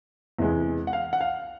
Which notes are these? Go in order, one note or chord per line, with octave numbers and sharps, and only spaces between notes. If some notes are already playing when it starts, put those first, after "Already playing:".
E2 C3 E3 G#3 B3
F#5
F5
F#5
F5